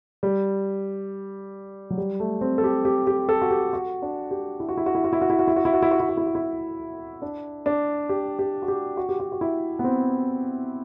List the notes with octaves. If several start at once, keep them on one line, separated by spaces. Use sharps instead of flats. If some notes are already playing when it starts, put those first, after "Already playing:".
G3
F#3
G3
A3
C4
A4
G4
G4
G4
A4
F#4
G4
F#4
D4
G4
E4
F#4
E4
F#4
E4
F#4
E4
F#4
E4
F#4
E4
F#4
E4
F#4
E4
F#4
E4
F#4
E4
F#4
E4
D4
D4
G4
G4
F#4
G4
F#4
G4
F#4
F#4
E4
B3
C4